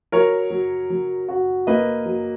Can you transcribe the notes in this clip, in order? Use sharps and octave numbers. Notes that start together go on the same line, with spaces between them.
F#3 A#4 C#5
F#3
F#3
F#4
A#3 B4 D#5
F#3